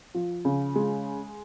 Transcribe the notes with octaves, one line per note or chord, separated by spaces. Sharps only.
F3
C#3
G#3